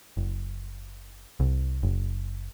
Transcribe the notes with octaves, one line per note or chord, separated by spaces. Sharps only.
F#1
C2
F#1